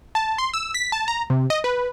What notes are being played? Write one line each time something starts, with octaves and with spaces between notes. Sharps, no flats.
A5
C6
E6
B6
A5
A#5
C3
D#5
B4